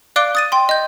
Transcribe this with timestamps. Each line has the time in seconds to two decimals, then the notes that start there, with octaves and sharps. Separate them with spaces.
0.16 D5 F5 D6 F#6 D7 G7
0.35 D#6 A6 D#7
0.52 G5 C6
0.69 D#5 G6